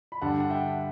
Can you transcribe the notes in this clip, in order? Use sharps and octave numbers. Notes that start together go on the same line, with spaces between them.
B5
G2 D3 G3 F#5 A5
F#5
E5 G5